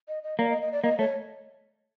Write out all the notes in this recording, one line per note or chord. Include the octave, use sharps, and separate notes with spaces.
D#5
D#5
A#3 D5
D#5
D#5
D5
A#3 D#5
A3 C#5